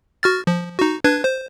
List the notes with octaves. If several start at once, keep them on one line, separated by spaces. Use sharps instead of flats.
F#4 F6 A6
F3
D#4 F#4
D4 B4 G#6
C5